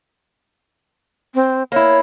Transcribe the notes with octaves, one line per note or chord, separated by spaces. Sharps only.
C4
A#3 E4 C#5